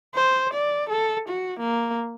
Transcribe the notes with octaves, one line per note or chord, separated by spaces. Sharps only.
C5
D5
A4
F#4
A#3